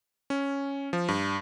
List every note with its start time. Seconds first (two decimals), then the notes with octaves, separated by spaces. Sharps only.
0.30 C#4
0.93 F3
1.08 G2